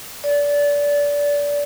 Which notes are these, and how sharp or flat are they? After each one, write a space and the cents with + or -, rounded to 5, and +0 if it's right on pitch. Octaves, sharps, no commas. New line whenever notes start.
D5 -25